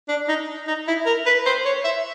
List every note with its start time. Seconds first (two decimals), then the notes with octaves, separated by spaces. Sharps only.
0.09 D4
0.29 D#4
0.67 D#4
0.87 E4
1.06 A#4
1.26 B4
1.46 C5
1.65 C#5
1.85 E5